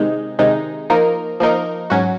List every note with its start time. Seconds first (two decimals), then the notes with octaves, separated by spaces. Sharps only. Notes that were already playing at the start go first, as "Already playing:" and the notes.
Already playing: C3 D#3 G#3 D#4
0.39 C3 D#3 G#3 D#4
0.90 F3 A#3 D#4 A#4
1.40 F3 A#3 D#4 A#4
1.90 G#2 F#3 C#4 F#4